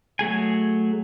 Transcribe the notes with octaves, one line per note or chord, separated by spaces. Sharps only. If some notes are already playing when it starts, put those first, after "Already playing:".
F#3 A3 G#4 G#5